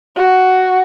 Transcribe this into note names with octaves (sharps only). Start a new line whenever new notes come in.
F#4